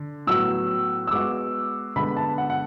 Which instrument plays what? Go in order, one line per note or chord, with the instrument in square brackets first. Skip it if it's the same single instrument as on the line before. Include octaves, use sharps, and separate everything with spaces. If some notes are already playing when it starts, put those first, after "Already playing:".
Already playing: [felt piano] D3
[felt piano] A2 F#3 B3 F#4 [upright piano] E6
[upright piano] E6
[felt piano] G#3 B3 F#4 [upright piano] D6
[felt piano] D3 G#3 B3 [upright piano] B5
[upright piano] A5
F#5
F#5